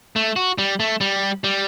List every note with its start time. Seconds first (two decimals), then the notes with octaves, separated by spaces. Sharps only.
0.16 A3
0.36 F#4
0.58 G3
0.80 A3
1.01 G3
1.44 G3